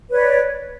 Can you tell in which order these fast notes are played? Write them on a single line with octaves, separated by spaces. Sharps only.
B4 C#5 D5